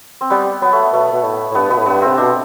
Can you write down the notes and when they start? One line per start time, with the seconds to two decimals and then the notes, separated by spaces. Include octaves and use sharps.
0.21 C4
0.30 G3 B3
0.62 F#3 B3
0.73 A3
0.92 B2 A3
1.13 B2
1.23 A2
1.51 A2
1.55 G2 B3
1.69 B2 B3
1.78 A2
1.86 G2 B3
2.02 C4
2.07 C3
2.18 B2 D4